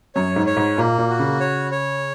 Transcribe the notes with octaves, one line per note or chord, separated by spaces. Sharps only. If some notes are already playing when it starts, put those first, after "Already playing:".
F#2 C#5
G#2
C#5
G#2
A#2 A#3
A#2
F#4
C#3
C#5
C#5